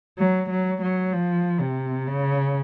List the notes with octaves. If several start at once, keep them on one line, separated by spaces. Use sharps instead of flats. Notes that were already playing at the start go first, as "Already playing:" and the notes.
F#3
F#3
F#3
F3
C3
C#3